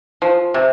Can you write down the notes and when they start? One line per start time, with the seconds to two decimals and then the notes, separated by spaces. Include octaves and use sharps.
0.22 F3
0.54 C3